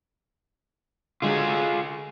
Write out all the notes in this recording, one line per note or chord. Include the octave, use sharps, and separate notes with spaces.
D3 G#3 F4 F#4 G#4